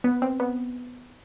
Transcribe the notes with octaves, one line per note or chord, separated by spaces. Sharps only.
B3
C4
B3